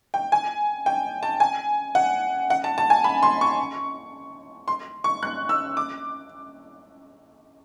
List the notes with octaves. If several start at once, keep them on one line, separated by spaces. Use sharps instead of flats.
G5
G#5
G5
A5
G#5
F#5
F#5
A5
A5
G#5
B5
C6
C#6
C6
C#6
F#6
E6
D6